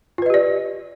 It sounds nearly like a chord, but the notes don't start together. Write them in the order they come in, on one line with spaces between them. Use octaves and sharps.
F4 B4 D#5 G4 D5